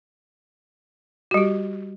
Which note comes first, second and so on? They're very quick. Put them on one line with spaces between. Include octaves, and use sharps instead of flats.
F#4 G3 G4